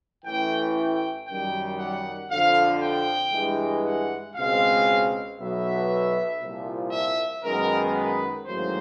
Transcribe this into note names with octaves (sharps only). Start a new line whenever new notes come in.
A1 A2 E3 G5
G5
F#2 D#3 G3 G5
F#5
F2 D3 F3 F5
G5
G2 E3 G#3
F#5
C#2 B2 G#3 C4 F5
B1 B2 F#3 B3 E5
C2 A#2 F3
E5
F#2 D#3 G#3 B3 A#4
B4
A1 G#2 D#3 F#3 A#3 C5